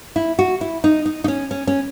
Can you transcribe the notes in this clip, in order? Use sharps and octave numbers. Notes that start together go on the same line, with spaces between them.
E4
F#4
E4
D#4
D#4
D#4
C#4
C#4
C#4